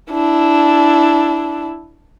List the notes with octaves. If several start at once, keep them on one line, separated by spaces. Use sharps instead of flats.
D4 E4